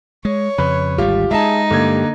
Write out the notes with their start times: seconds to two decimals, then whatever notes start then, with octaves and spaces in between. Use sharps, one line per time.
0.25 G#3 C#5
0.58 F2 C#3 B4
0.98 G#1 D2 G3 F4 G4
1.31 G#3 D#4 G#4 E5 A5
1.71 G2 D3 A#3 G4 G#6